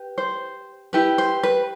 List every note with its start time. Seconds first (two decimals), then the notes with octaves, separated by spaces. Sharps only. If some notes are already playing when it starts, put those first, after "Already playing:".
Already playing: G4 B4
0.18 C5
0.93 E4 G4 B4
1.18 C5
1.43 B4